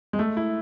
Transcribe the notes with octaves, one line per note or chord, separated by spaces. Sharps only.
G#3
A3
E4